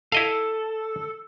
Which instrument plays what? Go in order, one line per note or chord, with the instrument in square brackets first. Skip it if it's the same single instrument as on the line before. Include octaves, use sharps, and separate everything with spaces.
[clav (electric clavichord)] E4 D#5 F5 [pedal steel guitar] A4